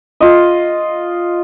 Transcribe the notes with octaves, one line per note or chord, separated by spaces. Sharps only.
F4 D#5